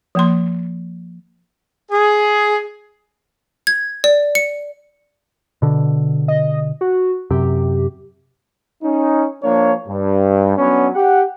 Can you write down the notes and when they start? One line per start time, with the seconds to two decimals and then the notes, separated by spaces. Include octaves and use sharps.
0.15 F3 A#3 C6
1.91 G#4
3.67 G#6
4.04 D5
4.35 C#7
5.62 B2 D3
6.28 D#5
6.81 F#4
7.31 F#2 C3 G4
8.83 C#4 D#4
9.43 F3 A#3 D4 C#5
9.88 G2
10.57 F#3 B3 C#4 D4 C#5
10.95 G4 F#5